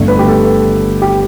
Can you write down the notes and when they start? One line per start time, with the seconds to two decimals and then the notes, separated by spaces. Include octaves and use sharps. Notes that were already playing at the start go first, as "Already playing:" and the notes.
Already playing: G1 G2 D3 A3
0.08 B4
0.19 G4
0.28 A4
1.02 G4